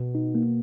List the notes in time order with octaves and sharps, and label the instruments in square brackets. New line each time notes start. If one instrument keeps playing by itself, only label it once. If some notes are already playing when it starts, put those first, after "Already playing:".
Already playing: [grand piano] B2
[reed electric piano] D#4
A#3